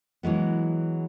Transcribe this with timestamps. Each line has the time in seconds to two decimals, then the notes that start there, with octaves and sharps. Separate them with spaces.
0.23 E3 F#3 G#3 B3